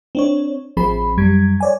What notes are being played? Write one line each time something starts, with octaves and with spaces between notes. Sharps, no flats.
C4 D4 C#5
A1 F3 C4 G#4 B5
F#2 G3 G#6
C#5 D5 G#5